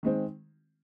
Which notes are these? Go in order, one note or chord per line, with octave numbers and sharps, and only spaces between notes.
D#3 G#3 C4